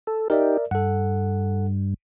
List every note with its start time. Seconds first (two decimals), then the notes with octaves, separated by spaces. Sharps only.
0.07 A4
0.30 D#4 G4 A#4 D5 E5
0.71 G2 A4 F#5